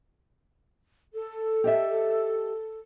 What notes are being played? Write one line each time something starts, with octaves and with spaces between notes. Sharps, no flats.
A4
G4 D#5 E5